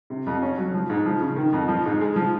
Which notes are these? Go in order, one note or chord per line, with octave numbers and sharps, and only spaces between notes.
C3
F2
C#4
F#3
F3
G#2
F3
C#3
D#3
F2
F3
G#2
G#3
F3